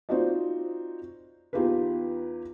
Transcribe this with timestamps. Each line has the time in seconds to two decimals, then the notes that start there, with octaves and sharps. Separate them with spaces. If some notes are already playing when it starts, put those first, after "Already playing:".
0.09 C4 D#4 F4 F#4 D5 D#5
1.53 E2 D#4 F4 G4 G#4 B4